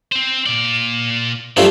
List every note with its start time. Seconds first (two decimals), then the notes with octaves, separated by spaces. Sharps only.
0.12 C4 C5
0.46 A#2 D5
1.57 G2 F3 A3 E4 F4